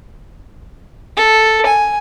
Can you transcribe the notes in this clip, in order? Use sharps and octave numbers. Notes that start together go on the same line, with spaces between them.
A4
G#5